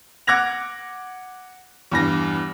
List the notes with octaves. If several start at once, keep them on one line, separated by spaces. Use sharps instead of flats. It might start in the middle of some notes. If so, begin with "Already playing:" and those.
F#5 D6 F#6 G#6 A#6 F7
E2 G2 A#6